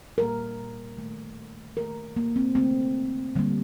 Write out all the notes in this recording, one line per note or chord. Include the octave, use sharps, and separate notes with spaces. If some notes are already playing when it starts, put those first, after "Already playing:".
A#2 G3 A#3 A#4
D#3 A3
D#3 A3 A#4
A#3
C4
D3 A3 C4
D3 G3 A#3